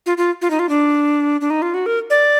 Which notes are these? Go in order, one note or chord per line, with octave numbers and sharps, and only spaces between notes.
F4
F4
F4
D#4
F4
D4
D4
D#4
F4
F#4
A#4
D5